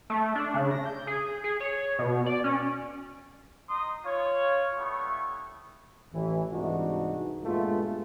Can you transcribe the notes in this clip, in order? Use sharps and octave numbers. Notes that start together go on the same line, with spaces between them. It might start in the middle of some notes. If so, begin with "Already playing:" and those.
A3
D4
C#3
A#6
G6
G#4
G#4
C#5
B2
D5
C#4
D#4 C6 D#6
F4 C#5
G3 A3 B3 E4 C#6
A1 E3
C2 G#2 E3 D4 D#4 F#4
G2 A#2 G#3 A3 B3 F4